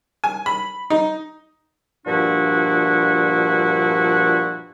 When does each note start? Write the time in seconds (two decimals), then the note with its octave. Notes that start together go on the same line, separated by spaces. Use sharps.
0.24 G#5
0.46 B5
0.90 D#4
2.06 G2 A#2 F3 D4 E4 F#4